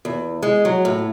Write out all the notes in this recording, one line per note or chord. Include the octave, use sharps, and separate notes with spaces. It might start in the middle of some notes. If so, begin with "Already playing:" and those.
E2
G#3
F#3
A2